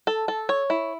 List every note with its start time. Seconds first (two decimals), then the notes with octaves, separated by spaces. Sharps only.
0.07 A4
0.28 A4
0.49 C#5
0.70 E4